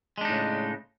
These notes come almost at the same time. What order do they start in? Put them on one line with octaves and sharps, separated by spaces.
G#3 D4 D#4 A2 C#3